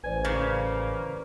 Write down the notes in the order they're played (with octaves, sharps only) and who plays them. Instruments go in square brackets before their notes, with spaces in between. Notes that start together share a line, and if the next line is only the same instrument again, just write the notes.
[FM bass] A1 [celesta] B4 C5 D5 [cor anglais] G#5
[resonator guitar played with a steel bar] C#3 [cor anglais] A#3